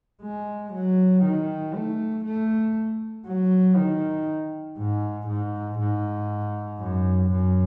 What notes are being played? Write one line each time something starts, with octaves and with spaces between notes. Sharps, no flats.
G#3
F#3
D#3
A3
A3
F#3
D#3
G#2
G#2
G#2
F#2
F#2